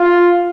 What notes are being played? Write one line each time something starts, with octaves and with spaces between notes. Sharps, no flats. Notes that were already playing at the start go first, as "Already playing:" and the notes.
Already playing: F4